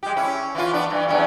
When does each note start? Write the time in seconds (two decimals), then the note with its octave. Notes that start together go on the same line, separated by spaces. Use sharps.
0.03 G#3 G4
0.17 C#4 E4
0.55 E3 F4
0.73 B3 D4
0.90 G2 E3
1.08 E2 G2 C#4